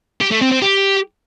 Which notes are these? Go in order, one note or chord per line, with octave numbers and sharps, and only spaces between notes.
G4
A3
C4
C4
G4